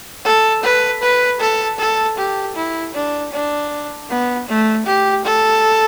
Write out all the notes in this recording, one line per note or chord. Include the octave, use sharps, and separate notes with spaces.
A4
B4
B4
A4
A4
G4
E4
D4
D4
B3
A3
G4
A4